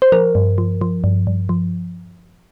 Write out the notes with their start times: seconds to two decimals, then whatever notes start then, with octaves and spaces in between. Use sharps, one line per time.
0.02 C5
0.12 F3 A#4
0.35 G2
0.58 F3
0.81 F3
1.04 G2
1.27 G2
1.49 F3